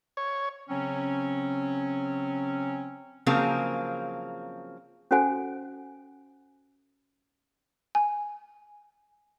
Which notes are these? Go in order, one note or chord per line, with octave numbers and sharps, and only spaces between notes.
C#5
C#3 F#3 C4 C#4
C#3 F3 F#3 A#3 C4 G#4
C#4 F#4 A4 C5 F#5 G#5
G#5